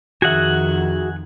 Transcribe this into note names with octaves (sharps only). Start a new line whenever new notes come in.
F2 D#3 F#4 G#4 E5 F#5 G#5